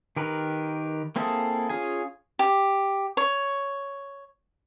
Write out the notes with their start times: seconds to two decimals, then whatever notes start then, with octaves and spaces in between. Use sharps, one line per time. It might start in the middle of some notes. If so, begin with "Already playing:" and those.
0.16 D#3 G4 A#4 B4
1.16 A#3 C4 E4 G#4 A4
1.69 C#4 F4 G#4 G#5
2.39 G4
3.17 C#5